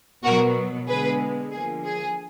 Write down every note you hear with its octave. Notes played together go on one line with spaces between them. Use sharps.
B2 F#3 B3 F#4 A#4
D3 G#3 B3 G#4 B4
D3 F3 A#3 G#4
G#4